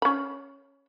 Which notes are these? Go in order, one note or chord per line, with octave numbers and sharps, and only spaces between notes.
C#4 B5